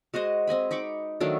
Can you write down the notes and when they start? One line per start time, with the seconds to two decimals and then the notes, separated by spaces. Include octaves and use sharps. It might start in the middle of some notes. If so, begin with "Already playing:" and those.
0.14 G#3 F#4 C5 D#5
0.47 C4 D#5 G#5 B5
0.71 D#4 B5 C#6 D6
1.20 D#3 F#3 A3 D4